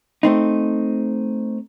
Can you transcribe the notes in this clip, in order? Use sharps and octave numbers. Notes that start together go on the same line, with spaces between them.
A3 C4 D#4